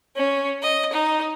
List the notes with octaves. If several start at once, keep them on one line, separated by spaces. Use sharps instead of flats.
C#4
D#5
D#4